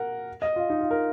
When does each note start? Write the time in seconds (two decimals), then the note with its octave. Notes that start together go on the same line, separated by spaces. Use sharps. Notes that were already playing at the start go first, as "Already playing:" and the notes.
Already playing: A#4 F#5
0.42 D#5
0.56 F4
0.70 D#4
0.81 F4
0.91 A#4